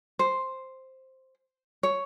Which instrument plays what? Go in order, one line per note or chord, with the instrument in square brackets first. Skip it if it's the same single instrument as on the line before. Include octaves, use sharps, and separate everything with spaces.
[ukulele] C5
C#5